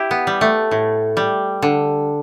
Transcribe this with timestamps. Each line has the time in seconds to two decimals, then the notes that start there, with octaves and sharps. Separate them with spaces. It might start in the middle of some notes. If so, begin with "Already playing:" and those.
Already playing: E4 G4
0.11 B3
0.27 G3
0.41 A3
0.71 A2
1.17 G3
1.62 D3